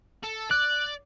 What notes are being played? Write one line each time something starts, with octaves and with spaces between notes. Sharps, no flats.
A4
D5 F#6